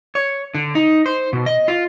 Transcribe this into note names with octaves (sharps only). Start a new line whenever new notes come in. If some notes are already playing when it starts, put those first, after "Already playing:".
C#5
D3
D#4
C5
B2
D#5
F4